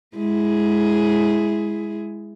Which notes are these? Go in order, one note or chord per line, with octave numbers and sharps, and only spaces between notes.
G#3 E4 G#4